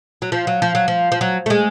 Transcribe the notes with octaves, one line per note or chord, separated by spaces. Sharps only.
F#3
F3
F#3
F3
F#3
F3
F3
F#3
A3
G#3